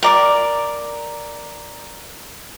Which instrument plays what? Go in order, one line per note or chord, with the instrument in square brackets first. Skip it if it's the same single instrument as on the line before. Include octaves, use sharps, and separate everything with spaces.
[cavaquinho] A#4 D5 D6